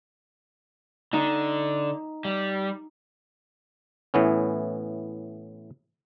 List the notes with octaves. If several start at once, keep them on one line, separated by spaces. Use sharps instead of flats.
D3 D#4
G3
A2 E3 B3 C#4